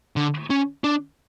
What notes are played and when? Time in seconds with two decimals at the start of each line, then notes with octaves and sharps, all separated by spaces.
0.16 D3
0.50 C#4
0.84 D4